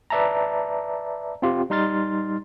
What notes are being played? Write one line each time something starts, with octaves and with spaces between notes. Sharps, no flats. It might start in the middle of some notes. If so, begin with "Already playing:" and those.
B4 D5 E5 A5 A#5
C4 F4 G4
G3 D#4 C6 F6 A6